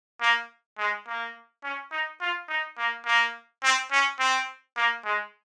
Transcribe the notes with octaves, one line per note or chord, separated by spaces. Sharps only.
A#3
G#3
A#3
C#4
D#4
F4
D#4
A#3
A#3
C4
C#4
C4
A#3
G#3